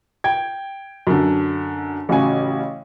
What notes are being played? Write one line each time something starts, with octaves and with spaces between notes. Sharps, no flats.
G5 G#6
F#2 D3
A1 C#3 F#4 G#5